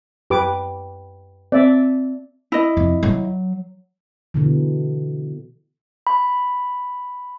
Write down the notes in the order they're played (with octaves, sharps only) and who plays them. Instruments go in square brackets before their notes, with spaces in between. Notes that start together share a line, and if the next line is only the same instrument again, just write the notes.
[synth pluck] F#2 [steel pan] G4 B4 D6
[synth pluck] C4 [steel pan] D5 E5
[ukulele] E4 D#5
[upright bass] F2
F#3
[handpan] B2 D3 E3
[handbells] B5